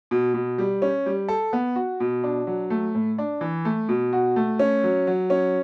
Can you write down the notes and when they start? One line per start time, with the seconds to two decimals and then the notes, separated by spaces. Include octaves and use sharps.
0.11 B2
0.34 B2
0.58 G3
0.82 C#4
1.06 G3
1.28 A4
1.53 B3
1.76 F#4
2.00 B2
2.24 D4
2.47 F#3
2.70 A3
2.95 A2
3.18 D4
3.41 E3
3.65 A3
3.89 B2
4.13 F#4
4.36 A3
4.59 C#4
4.83 F#3
5.07 F#3
5.30 C#4